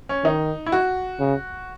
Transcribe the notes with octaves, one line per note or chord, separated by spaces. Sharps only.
C#4
D#3 D#4
E4
F#4
C#3